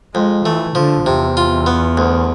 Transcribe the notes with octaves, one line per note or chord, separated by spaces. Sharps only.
F2 G#3
E3 A3
D3 F3
E2 C3
F4
B3
D2